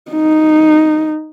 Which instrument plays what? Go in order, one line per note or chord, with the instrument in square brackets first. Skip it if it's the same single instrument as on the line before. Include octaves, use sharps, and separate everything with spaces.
[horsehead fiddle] D#4